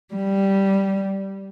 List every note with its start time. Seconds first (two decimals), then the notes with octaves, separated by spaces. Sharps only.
0.14 G3